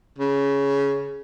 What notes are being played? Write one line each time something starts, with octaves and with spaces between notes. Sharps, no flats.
C#3